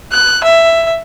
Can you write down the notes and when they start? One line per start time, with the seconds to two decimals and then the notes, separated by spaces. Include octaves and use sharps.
0.12 F#6
0.44 E5